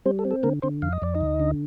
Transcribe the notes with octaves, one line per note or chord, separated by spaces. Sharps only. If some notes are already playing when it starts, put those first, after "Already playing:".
G3 C4 C5
A4
C4
A4
D3 A#3 A#4
D3 C4 C5
F2 F5
D#5
F2 D5
D#4 D#5
D2
D3